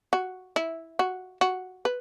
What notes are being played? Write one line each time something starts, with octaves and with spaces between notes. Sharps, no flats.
F#4
E4
F#4
F#4
B4